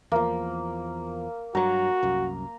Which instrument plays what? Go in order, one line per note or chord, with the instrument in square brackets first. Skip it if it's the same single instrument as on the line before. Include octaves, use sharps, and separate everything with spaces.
[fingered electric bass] E2 F3 [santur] A#3
[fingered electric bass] G2 F#3 [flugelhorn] F#4 [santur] A#5
[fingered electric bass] C2 F#2